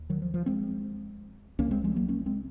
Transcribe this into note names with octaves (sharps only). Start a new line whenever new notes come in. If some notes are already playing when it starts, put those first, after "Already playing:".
Already playing: D#2
D#3 F#3
F3
F3
G#3 C4
C2 C3 A#3 C#4
G#3 C4
F3 G#3
F#3 A#3
A#3 C#4
G#3 C4